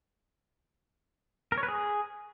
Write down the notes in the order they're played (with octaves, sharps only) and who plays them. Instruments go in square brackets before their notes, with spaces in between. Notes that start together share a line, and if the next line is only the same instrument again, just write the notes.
[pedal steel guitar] A#4
C#5
B4
G#4